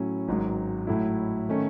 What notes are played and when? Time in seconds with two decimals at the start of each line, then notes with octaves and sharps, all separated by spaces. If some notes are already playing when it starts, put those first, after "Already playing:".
Already playing: A2 F#3 C#4 E4
0.28 G#1 G#2 F#3
0.87 A2 F#3 A3 E4
1.49 D#3 A3 C#4